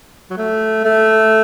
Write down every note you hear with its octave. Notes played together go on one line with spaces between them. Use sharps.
F#3
A3
A3